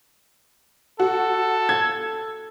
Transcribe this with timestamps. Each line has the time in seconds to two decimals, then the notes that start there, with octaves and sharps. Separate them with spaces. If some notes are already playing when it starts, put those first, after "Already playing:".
1.00 F#4 A4
1.69 G#6